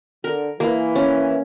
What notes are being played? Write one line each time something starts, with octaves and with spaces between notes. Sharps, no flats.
D3 A#4
E3 A#3
C#4